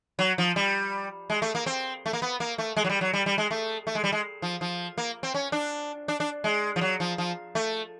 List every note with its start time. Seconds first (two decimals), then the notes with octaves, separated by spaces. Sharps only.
0.19 F#3
0.38 F3
0.56 G3
1.30 G#3
1.42 A3
1.55 A#3
1.66 C4
2.06 A3
2.13 A#3
2.22 B3
2.40 A#3
2.58 A3
2.76 G#3
2.84 F#3
2.90 G3
3.01 F#3
3.13 G3
3.26 G3
3.38 G#3
3.51 A3
3.87 A3
3.95 G#3
4.04 G3
4.12 G#3
4.42 F3
4.61 F3
4.98 A#3
5.23 C4
5.34 C#4
5.52 D4
6.08 D4
6.20 D4
6.44 G#3
6.76 F3
6.81 F#3
7.00 F3
7.18 F3
7.55 A3